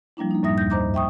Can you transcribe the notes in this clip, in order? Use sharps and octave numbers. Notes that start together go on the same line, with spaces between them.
F3 G3 A#3 D4 E4
A#3 D#4
F#2 A2 G3 E5 D#6 A#6
D#2 G6 A#6
G2 C5 D#5 A#5 D6 G6
E5 G5 C#6 D#6